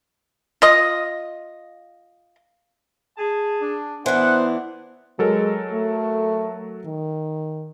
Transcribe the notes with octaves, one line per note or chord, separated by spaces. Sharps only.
F4 D#5
G#4 A5
D4
E3 B3 D4 C5 F#5
F#3 G#3 A4 A#4
A3
D#3